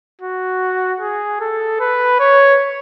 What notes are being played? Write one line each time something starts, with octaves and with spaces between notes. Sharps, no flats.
F#4
G#4
A4
B4
C#5